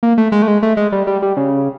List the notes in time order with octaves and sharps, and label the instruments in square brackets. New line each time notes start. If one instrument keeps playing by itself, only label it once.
[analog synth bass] A#3
A3
G#3
A3
G#3
A3
G#3
G3
G3
G3
C#3